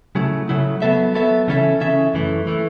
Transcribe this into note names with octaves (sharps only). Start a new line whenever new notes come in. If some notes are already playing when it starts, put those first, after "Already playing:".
C#3 F#3 A3 E4
C#3 F#3 A3 E4
F#3 B3 A4 E5
F#3 B3 A4 E5
C#3 E3 C#4 A4 E5
C#3 E3 C#4 A4 E5
F#2 E3 A3
E3 A3